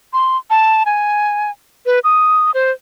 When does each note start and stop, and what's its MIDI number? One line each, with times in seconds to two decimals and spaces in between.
0.13 0.37 84
0.50 0.83 81
0.86 1.51 80
1.86 1.99 71
2.04 2.51 87
2.54 2.71 72